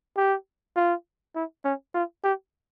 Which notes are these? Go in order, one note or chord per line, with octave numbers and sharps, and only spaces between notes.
G4
F4
E4
C#4
F4
G4